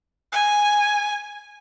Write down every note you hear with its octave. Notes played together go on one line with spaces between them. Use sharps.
G#5